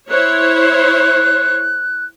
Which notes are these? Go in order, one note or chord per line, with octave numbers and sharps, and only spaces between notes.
E4 C5 C#5 F#6